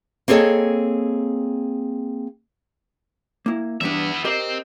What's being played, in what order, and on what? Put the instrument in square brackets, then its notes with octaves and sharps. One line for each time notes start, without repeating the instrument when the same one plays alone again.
[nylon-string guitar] A#3 C4 G#4 A4 C#5 D#5
[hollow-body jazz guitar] A#3 E4
[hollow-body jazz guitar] E2 G2 D4 [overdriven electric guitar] B3 E5
[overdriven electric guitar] C4 [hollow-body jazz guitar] G4 A#4 D#5